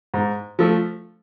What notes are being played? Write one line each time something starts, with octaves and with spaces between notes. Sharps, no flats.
G#2
F3 A3